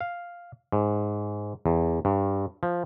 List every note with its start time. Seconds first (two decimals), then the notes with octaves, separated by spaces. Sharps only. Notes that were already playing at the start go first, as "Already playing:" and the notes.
0.01 F5
0.72 G#2
1.66 E2
2.05 G2
2.63 F3